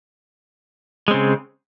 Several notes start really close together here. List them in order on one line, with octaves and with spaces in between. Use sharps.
G#3 C4 C#3